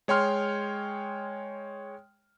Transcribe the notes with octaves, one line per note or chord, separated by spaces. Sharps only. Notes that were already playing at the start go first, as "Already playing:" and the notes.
G#3 C#5 G5 C6 F6